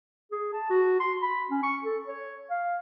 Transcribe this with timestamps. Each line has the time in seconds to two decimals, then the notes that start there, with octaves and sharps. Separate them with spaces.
0.32 G#4
0.53 A5
0.70 F#4
1.00 C6
1.22 B5
1.51 C#4
1.63 C#6
1.84 A4
2.07 C#5
2.50 F5